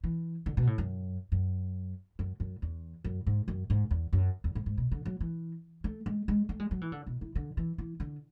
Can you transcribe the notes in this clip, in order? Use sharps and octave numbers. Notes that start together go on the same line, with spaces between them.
E3
D3
B2
A2
F#2
F#2
F#2
F#2
E2
F#2
G#2
F#2
G#2
E2
F#2
E2
G#2
G#2
B2
D3
F#3
E3
A3
G#3
G#3
A3
G#3
F#3
E3
D3
B2
E3
D3
E3
E3
D3